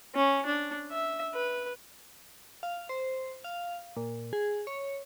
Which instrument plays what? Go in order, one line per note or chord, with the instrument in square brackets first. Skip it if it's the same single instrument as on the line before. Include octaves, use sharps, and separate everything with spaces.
[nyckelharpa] C#4
D4
E5
B4
[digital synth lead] F5
C5
F5
A#2
G#4
C#5